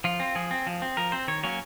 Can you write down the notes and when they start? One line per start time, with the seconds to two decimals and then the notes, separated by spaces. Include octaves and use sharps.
0.04 F3 F4
0.20 C4
0.35 F3 G#4
0.51 C4
0.67 F3
0.82 C4
0.97 F3 A#4
1.12 C4 C5
1.28 D#3 C#5
1.43 F#3 A#3 C#4 C#5